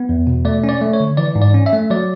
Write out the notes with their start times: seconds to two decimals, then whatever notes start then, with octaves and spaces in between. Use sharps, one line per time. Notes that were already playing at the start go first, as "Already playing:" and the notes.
Already playing: B3
0.09 E2
0.27 B2
0.45 A3 D5
0.64 C#4
0.69 D5
0.81 A3
0.93 C#5
1.00 D3
1.17 E3 D5
1.35 G#2
1.42 D5
1.54 C#4
1.66 E5
1.73 A3
1.90 F#3 D5